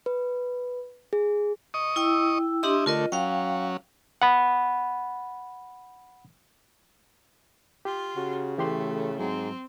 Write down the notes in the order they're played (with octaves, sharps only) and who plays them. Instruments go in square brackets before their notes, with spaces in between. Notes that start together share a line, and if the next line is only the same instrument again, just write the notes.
[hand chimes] B4
G#4
[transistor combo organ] D#5 C#6 D#6
[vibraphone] E4 G5 E6
[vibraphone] D4 G4 C6 [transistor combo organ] E4 D#5
[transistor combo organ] D3 A3 [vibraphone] F4 A#4 D#5
[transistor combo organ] F#3 C#4 [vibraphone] F5 G5
[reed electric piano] F#5 B5
[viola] F4 [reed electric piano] G4
[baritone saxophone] C#3 [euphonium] F#4
[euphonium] A2 [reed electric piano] E3 G4 C6 [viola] A3
[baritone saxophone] G#2 [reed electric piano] F#3 [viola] C4